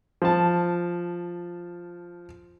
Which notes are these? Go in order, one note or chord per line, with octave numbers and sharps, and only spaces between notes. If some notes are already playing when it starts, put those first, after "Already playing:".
F3 A5